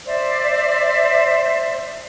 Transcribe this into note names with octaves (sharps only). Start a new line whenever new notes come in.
C5 D5 E5